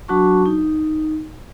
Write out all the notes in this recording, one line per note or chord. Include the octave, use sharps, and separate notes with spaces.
F#3 D4 F#4 A5 C#6
D#4